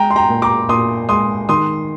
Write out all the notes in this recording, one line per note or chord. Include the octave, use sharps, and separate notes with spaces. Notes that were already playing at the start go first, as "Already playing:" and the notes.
Already playing: G#3 G5 A#5
C6
G5 A#5
A#2
A#5 D6
A#2 C6 D#6
G#3 C6 D#6
D#3 C6 D#6